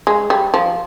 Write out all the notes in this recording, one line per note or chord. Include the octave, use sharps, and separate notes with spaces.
G#3
G3
F3